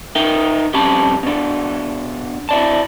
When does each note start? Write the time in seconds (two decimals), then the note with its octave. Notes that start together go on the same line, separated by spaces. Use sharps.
0.16 D#4 A#4 E5 G5
0.74 F2 G3 C#4 G4 A5 B5
1.23 B2 D4
2.49 E4 D5 A5